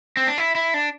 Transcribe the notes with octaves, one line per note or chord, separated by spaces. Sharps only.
C4
D4
E4
E4
D4